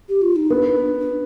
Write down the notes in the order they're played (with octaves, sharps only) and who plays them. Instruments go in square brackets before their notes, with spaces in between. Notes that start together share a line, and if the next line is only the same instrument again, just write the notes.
[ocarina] G4
F4
D#4
[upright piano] B3 [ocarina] D4
[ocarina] D4